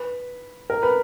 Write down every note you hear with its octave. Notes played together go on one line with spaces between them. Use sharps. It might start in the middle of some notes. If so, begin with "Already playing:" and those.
Already playing: B4
A#4
B4